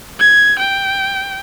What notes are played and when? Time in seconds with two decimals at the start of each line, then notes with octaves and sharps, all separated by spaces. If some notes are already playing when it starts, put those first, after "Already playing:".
0.20 G#6
0.59 G5